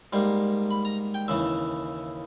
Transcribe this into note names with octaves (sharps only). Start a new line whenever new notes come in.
G#2 G3 A#3
B5
A#5
G5
D#2 C#3 E3 E5